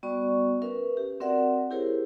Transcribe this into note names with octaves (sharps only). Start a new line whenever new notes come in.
G3 B3 F#4 D5 C#6
C#4 A#4 B4 E5
G4
C4 F#4 A#4 D5 E5 F#5
E4 G4 G#4 A#4 C5 C#5